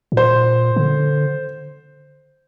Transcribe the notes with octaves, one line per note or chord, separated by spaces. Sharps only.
A2
A#2 C5
D3